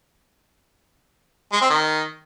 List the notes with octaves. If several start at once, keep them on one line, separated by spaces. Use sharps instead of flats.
G#3
C4
D#3